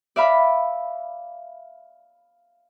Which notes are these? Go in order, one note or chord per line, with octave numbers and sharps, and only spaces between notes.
D5 E5 F5 B5